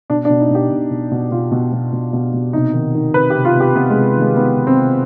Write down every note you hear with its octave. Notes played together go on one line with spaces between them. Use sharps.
B2 D4
D4
B2
D#4
B2 G4
B2
B2
B2
B2 F4
B2
B2
B2
B2
B2
C3 D#4
D#3
D#3
C3 B4
G4
C3
F4
C3
G4
C3 B3
G#3
C3
D#3 G#3
D#3 B3
C3
C4
C3